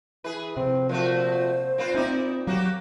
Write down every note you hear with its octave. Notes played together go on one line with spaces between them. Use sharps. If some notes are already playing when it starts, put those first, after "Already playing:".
E3 G#4 B4
F2 C3 C4
A#2 F3 A3 F#4 C5
A#2 C4 F4 B4
C4 C#4 D#4 E4 D5
F#3 A#3 F#4 G4